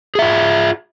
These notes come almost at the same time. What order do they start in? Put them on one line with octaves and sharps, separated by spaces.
G#4 E5 F4